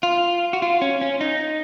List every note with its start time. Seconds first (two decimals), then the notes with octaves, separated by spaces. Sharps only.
0.03 F4
0.53 F#4
0.62 F4
0.82 C#4
1.01 C#4
1.21 D#4